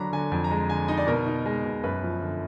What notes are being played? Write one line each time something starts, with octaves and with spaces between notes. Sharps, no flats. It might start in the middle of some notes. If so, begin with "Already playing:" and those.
Already playing: D3 F#3 D4 A#5 B5
D3 G#5
F2 G#5
A#5
G#3
D3 G#5
D#4 D#5
D5
B2 A#4
D#4
G#3
B2
F#2 B4
F3
D3